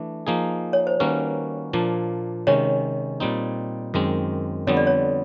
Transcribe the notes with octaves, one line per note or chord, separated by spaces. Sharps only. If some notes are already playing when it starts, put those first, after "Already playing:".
Already playing: E3 A3 D4
F3 A#3 D#4 G#4
C#5
C5
D#3 G3 A#3 C#4 F#4 B4
A#2 F3 A#3 D4
C3 D#3 G#3 C#4 C#5
A#2 G3 C4 D#4
F#2 D#3 G#3 C4
F2 D3 G3 B3 C#5
D5
C#5